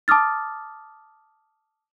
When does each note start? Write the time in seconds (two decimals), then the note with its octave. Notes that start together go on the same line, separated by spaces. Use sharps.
0.08 A5 D6 D#6 F6 A6